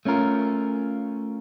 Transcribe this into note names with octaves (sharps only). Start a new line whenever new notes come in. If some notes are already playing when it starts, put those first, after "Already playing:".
A3 C#4 F4 A#4